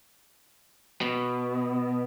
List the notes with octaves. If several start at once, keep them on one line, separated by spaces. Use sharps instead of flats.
B2